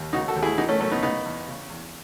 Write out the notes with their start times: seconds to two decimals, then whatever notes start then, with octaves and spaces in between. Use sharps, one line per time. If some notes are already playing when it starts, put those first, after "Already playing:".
Already playing: D#2
0.13 C#3 D#4 F#4
0.28 F#4 A4
0.36 D#2
0.43 E4 G#4
0.58 E3 D#4 F#4
0.69 A3 C#4
0.80 F#2 A3 C#4
0.91 B3 D#4
1.03 C#3 B3 D#4
1.26 E2
1.47 C#3
1.70 E2